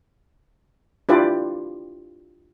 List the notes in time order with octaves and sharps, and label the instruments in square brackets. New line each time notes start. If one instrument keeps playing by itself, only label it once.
[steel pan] D4 E4 F4 G4 B4 D5